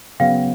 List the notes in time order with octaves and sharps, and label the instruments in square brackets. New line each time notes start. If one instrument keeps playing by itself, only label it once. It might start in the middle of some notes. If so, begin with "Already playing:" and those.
[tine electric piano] C#3 F#3 B3 [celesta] F5 G5